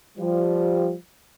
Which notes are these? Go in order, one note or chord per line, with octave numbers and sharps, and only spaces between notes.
F3 G3